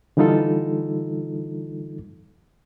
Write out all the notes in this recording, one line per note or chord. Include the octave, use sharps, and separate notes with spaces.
D3 E3 G3 D#4 F4 A4